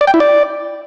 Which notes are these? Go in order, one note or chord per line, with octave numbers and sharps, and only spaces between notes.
D5
G5
E4
D5